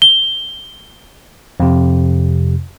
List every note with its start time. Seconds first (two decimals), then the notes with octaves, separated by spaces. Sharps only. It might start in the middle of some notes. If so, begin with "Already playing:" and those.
0.02 G7
1.60 F2 C3